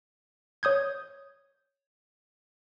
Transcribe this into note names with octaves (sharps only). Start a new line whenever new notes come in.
C#5 D#6 G6 G#6